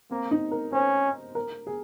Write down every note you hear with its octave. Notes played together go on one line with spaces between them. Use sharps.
A#3 C4
D#4
A#4
C#4 C5
A#4
G#4